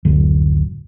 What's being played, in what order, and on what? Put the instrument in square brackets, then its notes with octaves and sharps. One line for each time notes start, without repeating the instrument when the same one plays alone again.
[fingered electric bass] F#1 D2 A2 F#3